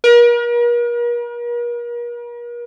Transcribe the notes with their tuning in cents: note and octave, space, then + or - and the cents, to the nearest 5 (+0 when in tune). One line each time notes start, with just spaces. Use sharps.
A#4 +40